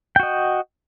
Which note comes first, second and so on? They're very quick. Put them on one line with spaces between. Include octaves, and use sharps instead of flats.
G5 F#4 D#5